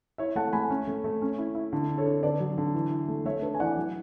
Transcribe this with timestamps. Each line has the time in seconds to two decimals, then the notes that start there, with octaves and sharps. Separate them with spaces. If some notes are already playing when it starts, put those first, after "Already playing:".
0.18 E4 C#5 E5
0.35 A3 F#5 A5
0.53 A3 G#5 B5
0.70 C#4
0.87 A3
1.04 A3
1.22 C#4
1.38 E4
1.55 E4
1.73 D3
1.89 D4
1.98 A4 C#5
2.06 D4
2.23 D3 B4 D5
2.40 F#3
2.58 D3
2.74 E3
2.91 E4
3.08 A3
3.25 A3 C#5 E5
3.42 D4 B4
3.55 G#5
3.59 E3 D5 F#5
3.77 F#3